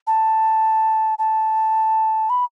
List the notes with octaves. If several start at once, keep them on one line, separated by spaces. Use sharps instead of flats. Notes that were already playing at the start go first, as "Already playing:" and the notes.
A5
A5
B5